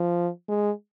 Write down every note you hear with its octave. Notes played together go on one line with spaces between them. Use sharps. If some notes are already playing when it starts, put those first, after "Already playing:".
Already playing: F3
G#3